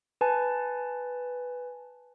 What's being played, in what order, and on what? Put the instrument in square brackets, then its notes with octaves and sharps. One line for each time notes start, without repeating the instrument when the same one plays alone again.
[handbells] B4 G#5 A5